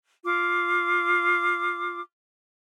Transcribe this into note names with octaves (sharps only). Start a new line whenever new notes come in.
F4 D6